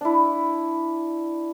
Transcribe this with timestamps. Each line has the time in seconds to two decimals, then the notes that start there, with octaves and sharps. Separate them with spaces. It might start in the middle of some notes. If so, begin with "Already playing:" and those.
0.01 D4 E4